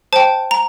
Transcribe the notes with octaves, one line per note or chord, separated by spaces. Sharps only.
C5 G5 A5
A#5